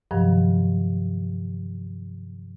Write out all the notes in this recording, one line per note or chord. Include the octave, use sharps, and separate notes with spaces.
G2 C3 D#3 F3 F#3